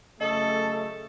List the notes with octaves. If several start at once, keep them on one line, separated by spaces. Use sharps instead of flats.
F#2 C#3 A3 A4 D#5 D#6